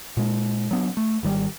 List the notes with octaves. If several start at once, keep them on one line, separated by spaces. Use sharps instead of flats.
A#2 G#3
F#3 B3 D4
A3
G#1 D#3 G3